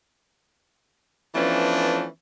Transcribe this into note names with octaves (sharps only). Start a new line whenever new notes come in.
E3 F3 A3 B3 C#4 D4